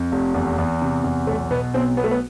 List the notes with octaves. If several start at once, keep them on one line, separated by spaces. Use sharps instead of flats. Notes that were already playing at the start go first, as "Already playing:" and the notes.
Already playing: F2
F1
E2
E2
C3
E2
B1 A3
B2 B3
B1 C4
B1 B3
A3
B3